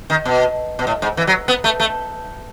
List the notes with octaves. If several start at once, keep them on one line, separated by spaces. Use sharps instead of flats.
D#3
B2
B2
A2
G#2
E3
F#3
B3
A3
A3